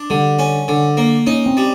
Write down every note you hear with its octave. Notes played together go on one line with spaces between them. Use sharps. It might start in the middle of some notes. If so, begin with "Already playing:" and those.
Already playing: D4
D3 G3
C#4
D3
A#3
C#4 D#4
C4
G3